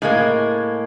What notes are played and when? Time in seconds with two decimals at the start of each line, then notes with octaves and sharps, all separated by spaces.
0.02 A2 G#3 A#3